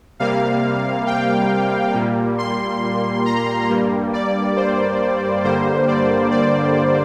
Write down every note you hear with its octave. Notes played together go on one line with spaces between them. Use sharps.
C3 G3 A#3 F5
G5
A#2 G3 A#3
C6
A#5
G2 G3 A#3
D5
C5
G2 D3 G3 A#3 C5
D5
D5